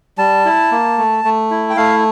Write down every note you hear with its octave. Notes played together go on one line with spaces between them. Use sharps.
G3 A5
E4
A#3
A3
A3
E4
G5
A3 F5